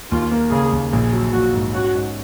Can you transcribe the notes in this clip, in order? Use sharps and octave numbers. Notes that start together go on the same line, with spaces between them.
D#2 F4
A#3
C#3 G#4
D#2
A#1 G#4
F#3
A#1 F#4
G#2
C#4 F#4
G#2